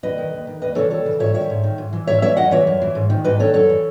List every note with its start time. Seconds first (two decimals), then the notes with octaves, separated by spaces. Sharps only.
0.03 D#2 B4 D#5
0.18 D#3
0.33 D#2
0.47 D#3
0.62 D#2 B4 D#5
0.76 C#3 E3 A4 C#5
0.90 D#2 A4 C#5
1.05 C#3 E3
1.20 G#2 C#5 E5
1.34 D#3 C#5 E5
1.50 G#2
1.64 D#3
1.78 G#2
1.93 E3
2.07 G#2 C#5 E5
2.22 E3 C#5 E5
2.37 F#2 D#5 F#5
2.51 E3 C#5 E5
2.67 F#2
2.82 E3
2.95 G#2
3.10 D#3
3.24 G#2 B4 D#5
3.39 D#3 A4 C#5
3.54 F#2 A4 C#5
3.69 E3